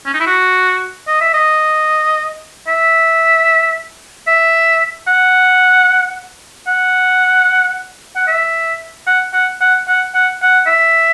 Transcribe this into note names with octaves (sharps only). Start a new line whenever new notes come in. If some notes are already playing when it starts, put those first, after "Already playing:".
C#4
D#4
E4
F#4
D#5
E5
D#5
E5
E5
F#5
F#5
F#5
E5
F#5
F#5
F#5
F#5
F#5
F#5
E5